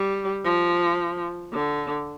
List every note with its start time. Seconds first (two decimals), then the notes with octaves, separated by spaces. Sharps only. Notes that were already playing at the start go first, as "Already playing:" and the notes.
Already playing: G3
0.45 F3
1.53 D3